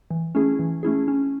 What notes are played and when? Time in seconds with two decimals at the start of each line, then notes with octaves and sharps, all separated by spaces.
0.10 E3
0.35 A3 C#4 E4 G#4
0.59 E3
0.83 A3 C#4 E4 G#4
1.08 C#4